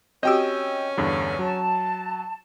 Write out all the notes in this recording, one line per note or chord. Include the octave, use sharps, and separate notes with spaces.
C4 C#4 F#4 G4 D#5 G5 E6
E2 G2 D3
F#3 A5